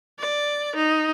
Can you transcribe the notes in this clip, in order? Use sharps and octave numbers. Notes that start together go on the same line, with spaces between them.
D5
D#4